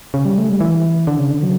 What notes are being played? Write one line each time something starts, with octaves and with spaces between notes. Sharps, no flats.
C#3
G3
A3
G3
E3
D3
C#3
D3
F#3